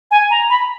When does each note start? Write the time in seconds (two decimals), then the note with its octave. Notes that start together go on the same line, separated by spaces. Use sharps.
0.11 G#5
0.31 A#5
0.50 B5